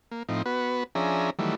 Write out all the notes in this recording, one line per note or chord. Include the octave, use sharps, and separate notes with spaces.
A#3
A2 F3 C4 D#4
B3 F#4 B4
F3 C#4 D4 G#4 E5 A#5
D#3 E3 F#3 G3 A3